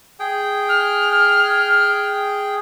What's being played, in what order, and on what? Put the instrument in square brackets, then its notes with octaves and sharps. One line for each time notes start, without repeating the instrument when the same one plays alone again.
[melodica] G#4 G5
[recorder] F6